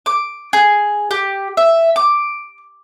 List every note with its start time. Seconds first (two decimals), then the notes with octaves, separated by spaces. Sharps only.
0.06 D6
0.53 G#4
1.11 G4
1.57 E5
1.96 D6